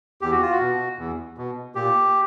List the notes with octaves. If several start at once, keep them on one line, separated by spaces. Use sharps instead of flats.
E2 G4
F#4
F4
F#4
B2
E2
B2
A#2 G4